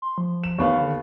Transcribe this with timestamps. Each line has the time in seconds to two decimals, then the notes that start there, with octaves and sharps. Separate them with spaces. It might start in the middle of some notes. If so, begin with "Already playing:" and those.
0.02 C6
0.18 F3
0.44 E7
0.58 D#2 B3 F5 C#6
0.81 D3